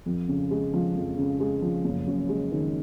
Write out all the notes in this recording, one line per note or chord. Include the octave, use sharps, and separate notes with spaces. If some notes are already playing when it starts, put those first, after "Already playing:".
F2
C#3
G#3
F3
F2
C#3
G#3
F3
F#1
F#2
G#3
D#3